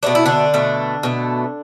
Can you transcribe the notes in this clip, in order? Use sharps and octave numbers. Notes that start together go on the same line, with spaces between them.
B2 A3 D4
E4
D3 D4
B2 A3
B2 A3